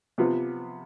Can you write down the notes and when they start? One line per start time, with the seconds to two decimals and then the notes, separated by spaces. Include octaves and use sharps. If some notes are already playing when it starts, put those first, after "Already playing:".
0.18 C3 F3 B3 F4